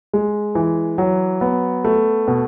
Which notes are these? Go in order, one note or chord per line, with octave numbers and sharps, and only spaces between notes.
G#3
E3
F#3
B3
A3
B2